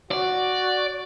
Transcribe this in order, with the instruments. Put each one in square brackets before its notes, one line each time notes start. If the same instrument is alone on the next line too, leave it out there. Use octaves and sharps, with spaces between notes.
[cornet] F#4 [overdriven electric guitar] D5